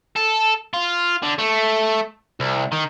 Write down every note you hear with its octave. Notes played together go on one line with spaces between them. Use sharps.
A4
F4
D3
A3
C2
D#3